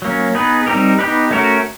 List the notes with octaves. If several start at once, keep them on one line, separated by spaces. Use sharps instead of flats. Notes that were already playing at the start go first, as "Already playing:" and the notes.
F#3 A#3 C#4
B3 D#4 G#4 B4
G3 C4 D#4 G4 A#4
B3 D#4 G4 B4
A3 C#4 F#4 A#4